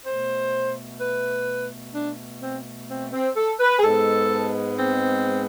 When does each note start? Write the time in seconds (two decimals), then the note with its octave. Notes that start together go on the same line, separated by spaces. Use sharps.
0.06 B2 A3 C5
1.01 B4
1.95 D4
2.42 C4
2.90 C4
3.13 C4
3.36 A4
3.60 B4
3.79 G#4
3.84 G#2 G#3 B3 A4
4.78 C4